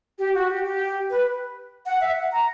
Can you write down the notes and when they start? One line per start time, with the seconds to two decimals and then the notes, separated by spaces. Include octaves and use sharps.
0.19 G4
0.34 F#4
0.49 G4
0.64 G4
1.10 B4
1.86 F#5
2.01 E5
2.17 F#5
2.32 A#5